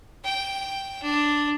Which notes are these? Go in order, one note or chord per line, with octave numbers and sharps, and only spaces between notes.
G5
D4